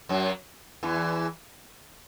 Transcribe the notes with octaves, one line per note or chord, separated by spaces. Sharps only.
F#2 F#3
E2 E3